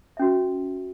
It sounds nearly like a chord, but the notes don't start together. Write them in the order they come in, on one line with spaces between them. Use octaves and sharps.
E5 C#4 F#4